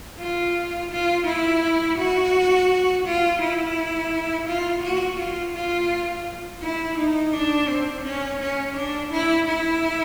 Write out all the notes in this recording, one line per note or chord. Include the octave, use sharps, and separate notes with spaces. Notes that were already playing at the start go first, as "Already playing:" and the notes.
F4
F4
E4
F#4
F4
E4
F4
F#4
F4
F4
E4
D#4
D4
C4
C#4
C#4
D4
E4
E4